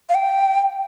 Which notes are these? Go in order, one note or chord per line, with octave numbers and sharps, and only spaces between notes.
F5
G5